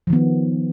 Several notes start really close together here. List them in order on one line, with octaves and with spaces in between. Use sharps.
F3 D#3 B3